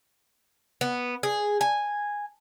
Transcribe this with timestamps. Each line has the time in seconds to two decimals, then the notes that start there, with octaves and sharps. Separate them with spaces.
0.81 B3
1.23 G#4
1.61 G#5